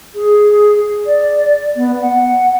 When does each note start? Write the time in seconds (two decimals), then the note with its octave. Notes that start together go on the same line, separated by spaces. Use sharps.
0.15 G#4
1.06 D5
1.76 B3
2.01 F#5